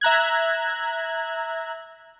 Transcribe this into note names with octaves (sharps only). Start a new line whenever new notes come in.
E5 A#5 F#6 G#6